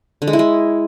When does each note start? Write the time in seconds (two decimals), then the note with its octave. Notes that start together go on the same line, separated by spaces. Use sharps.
0.22 D3
0.27 G#3
0.33 E4
0.39 G#3